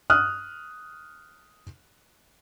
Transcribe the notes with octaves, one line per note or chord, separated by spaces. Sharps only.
D#6 F6 F#6